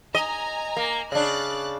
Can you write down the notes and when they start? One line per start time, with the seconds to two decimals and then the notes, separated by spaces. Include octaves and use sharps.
0.15 D#5 G#5 A#5
0.77 A#3
1.12 C#3 D4 F#6 A6